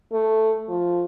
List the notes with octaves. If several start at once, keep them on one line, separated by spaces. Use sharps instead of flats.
A3
F3